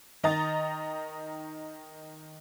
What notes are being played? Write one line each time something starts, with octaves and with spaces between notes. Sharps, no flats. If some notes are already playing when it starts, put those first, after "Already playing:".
D#3 D#5 A#5 A6